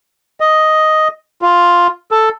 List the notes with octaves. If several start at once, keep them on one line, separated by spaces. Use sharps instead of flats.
D#5
F4
A4